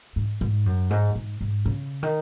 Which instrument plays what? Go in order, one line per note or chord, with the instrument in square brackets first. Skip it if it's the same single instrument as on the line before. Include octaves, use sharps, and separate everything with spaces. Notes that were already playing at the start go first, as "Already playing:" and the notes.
[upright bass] G#2
G#2
F#2
G#2
G#2
G#2
C#3
D#3